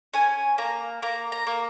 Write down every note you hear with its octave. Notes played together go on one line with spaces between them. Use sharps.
C#4 G#5
A#3 A#5
A#3 A#5
A#5
A#3